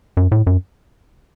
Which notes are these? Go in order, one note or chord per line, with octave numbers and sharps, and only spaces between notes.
F#2
A2
F#2